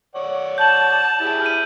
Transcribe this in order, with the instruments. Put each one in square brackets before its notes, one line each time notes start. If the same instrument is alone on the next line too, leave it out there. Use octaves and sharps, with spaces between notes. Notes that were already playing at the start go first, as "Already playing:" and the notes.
[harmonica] C#5 D5 F#5
[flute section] A5 [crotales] G6 F#7
[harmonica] E4 G4 G#4
[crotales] F6 D#7